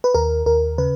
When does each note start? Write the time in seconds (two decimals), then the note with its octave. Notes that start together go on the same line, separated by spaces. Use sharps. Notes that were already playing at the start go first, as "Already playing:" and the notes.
0.04 B4
0.14 D#2 A#4
0.46 D#2 A#4
0.78 C#3 B4